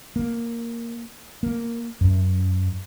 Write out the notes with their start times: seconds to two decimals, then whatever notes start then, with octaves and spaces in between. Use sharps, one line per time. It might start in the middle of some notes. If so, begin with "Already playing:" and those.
0.16 A#3
1.43 A#3
2.01 F#2